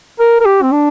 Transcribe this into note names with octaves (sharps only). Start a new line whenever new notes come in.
A#4
A#4
G4
C4
D4